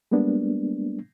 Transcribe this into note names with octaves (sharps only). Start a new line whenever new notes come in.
G3 G#3 A#3 B3 D4